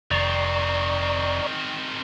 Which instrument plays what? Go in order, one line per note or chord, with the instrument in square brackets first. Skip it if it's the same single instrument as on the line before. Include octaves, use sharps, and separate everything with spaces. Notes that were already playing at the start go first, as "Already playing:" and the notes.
[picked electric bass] F1 [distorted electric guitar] D#3 C4 [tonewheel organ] D5 A#5 C#6